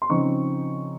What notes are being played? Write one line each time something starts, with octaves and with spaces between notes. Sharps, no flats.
C6
C#3 F3 C4 D#4 C#6